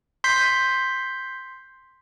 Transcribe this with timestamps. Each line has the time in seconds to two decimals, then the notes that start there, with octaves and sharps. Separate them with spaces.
0.24 C6 G6 B6 C7